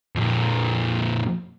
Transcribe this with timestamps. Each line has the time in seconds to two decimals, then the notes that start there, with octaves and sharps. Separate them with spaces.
0.16 F2 A#2